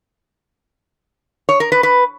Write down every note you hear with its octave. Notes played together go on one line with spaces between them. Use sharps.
C#5
A#4
B4
B4